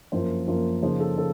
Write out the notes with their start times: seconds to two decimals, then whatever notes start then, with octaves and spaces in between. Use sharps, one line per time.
0.12 F#2 F3 A#3 F4 C5
0.47 F#2 F3 A#3 F4
0.83 C#3 F3 A#3 D#4 C5
1.00 A4
1.18 C#3 A4